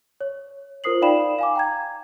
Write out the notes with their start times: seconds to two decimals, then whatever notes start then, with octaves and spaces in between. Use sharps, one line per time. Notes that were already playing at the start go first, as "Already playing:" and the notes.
0.21 C#5
0.84 F4 A#4 C5 D#6 C7 F#7
1.02 D#4 D5 F5 G5 B5 E7
1.39 F5 G#5 D6
1.55 G5 A#5 G#6